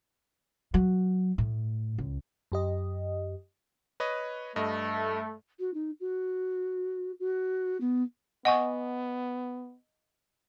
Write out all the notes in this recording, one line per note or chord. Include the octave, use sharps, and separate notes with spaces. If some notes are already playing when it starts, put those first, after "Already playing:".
F#3
A2
C#2
F#2 G4 D#5
B4 C#5 D#5
G2 A3 D#5
F#4
D#4
F#4
F#4
B3
B3 D#5 F#5 G#5 C#6 D#6